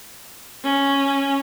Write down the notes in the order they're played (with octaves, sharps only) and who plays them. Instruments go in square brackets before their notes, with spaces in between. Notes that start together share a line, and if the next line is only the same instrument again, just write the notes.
[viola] C#4